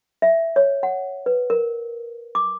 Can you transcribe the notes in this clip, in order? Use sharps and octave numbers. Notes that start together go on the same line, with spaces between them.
E5
C#5
F#5
B4
A#4
D6